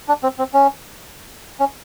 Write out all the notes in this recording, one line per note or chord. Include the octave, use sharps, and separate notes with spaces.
D4
C4
C4
C#4
C#4